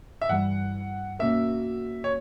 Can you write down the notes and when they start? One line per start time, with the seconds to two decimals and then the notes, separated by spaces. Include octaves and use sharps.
0.22 E5
0.29 G2 E3 G3 F#5
1.19 B2 A#3 C#4 F#4 A#4 E5
2.04 C#5